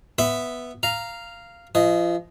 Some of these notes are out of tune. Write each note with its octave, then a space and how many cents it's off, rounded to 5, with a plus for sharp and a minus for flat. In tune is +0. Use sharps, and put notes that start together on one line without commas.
B3 +0 E5 +0 B5 +30
F5 -10 A#5 +0
F3 -35 D#5 +0